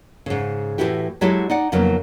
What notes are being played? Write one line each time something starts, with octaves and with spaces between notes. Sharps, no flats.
G#2 C#3
A2 E3 G3 E4 F#4 G4
F#3 G#3 E4 F#4 G4 A4
D#4 D5 F#5
F2 C#3 F#3 A#3 B3 D#4